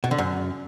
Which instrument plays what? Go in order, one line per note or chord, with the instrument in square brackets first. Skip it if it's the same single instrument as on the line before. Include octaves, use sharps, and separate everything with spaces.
[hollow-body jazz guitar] B2
D3
F#2